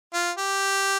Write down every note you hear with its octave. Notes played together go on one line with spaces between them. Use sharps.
F4
G4